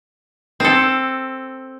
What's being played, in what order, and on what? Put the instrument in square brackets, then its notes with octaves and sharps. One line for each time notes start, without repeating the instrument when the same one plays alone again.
[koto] C4 A4